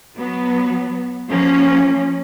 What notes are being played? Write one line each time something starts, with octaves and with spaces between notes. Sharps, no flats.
F#3 B3
F3 A#3 C#4